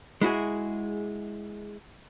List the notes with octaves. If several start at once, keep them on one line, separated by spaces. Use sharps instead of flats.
G#3 E4 F#4 G#4